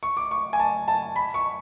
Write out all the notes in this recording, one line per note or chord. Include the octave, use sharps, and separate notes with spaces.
C#6
D6
C#6
G#5
A5
A5
B5
C#6